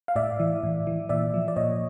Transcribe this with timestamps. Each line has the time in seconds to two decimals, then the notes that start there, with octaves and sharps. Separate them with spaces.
0.08 F5
0.16 A2 D5 E5
0.40 E3
0.63 A2
0.87 E3
1.09 A#2 D5 E5
1.34 F3
1.48 D5
1.56 A#2 C#5 D#5